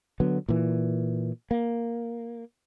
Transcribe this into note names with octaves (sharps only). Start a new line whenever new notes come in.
D3 F#3 B3
A#2 E3
A#3